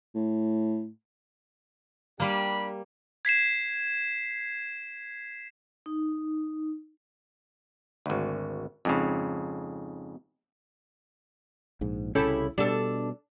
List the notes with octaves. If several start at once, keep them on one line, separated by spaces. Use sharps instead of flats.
A2
G3 A#3 D4 G4 B5
G#6 B6 C7 E7
D#4
G#1 D2
F2 G#2 C#3
A#1 G#2
C2 C#3 C#4 E4 G4 A4
B2 G3 D4 A4